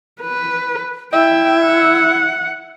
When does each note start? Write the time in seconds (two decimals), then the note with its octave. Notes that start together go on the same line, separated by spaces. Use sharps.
0.21 B4
1.13 E4 E5 G5
1.66 F#5